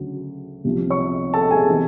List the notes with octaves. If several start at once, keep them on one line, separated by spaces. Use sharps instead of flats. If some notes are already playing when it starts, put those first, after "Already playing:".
Already playing: D2 C#3 F#3
C2 C3 F3
C#5 C#6
A4 A5
G#4 G#5
C3 E3